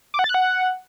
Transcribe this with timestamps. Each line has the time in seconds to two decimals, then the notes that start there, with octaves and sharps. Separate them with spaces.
0.14 D6
0.19 F#5
0.24 A6
0.29 F#6
0.34 F#5